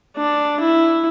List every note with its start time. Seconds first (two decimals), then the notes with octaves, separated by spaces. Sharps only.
0.17 D4
0.60 E4